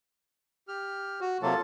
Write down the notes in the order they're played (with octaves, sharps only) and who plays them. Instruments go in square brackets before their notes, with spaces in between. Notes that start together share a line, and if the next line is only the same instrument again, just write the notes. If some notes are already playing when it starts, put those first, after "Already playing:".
[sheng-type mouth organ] G4 F6
[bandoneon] F#4
[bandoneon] C3 F#3 A#3 [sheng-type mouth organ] F4 A4 A5